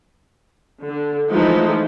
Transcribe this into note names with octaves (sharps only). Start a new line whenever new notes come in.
D3
E3 F3 G#3 A3 D#4